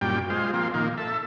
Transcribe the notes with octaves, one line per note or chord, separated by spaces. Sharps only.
F#2 A#2 G3 G5
G#3 F4 C5
F3 A#3 C4
A#2 D#3 A#3
A4 E5